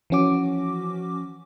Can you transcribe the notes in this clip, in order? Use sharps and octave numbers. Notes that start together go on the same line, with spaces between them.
E3 F3 C#4 F#4 D6